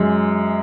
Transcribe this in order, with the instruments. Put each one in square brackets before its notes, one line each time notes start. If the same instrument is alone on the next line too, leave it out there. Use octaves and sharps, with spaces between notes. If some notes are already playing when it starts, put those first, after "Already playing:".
Already playing: [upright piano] F#2 G#3